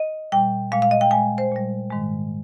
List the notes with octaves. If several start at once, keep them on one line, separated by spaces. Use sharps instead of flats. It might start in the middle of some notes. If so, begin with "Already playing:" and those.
Already playing: D#5
A#2 G3 G5
A#2 G#3 F5
F5
D#5
G5
A#2 G#3 G#5
C5
A#2 G3
G#2 D#3 G#3